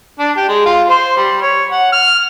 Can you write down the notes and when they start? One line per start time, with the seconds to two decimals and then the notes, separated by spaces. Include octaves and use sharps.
0.19 D4
0.37 G4
0.48 G#3
0.66 F4
0.89 C5
1.17 G3
1.42 C#5
1.71 F#5
1.92 F6